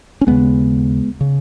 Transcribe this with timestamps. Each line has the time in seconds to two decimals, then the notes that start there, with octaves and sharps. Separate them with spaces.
0.21 C#4
0.27 D#2 C#3 G#3 B3
1.21 C#3